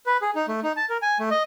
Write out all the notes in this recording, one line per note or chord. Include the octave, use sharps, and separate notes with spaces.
B4
G#4
D#4
A3
D#4
A5
A#4
G#5
A3
D#5